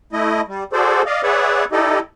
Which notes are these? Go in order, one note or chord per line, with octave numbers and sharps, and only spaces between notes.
A3 E4 D#5
G3
F#4 G#4 A4 C5 D5
D5 D#5 F5
G#4 B4 C#5 D5 E5 F#5
D#4 E4 G4 A4 D5 D#5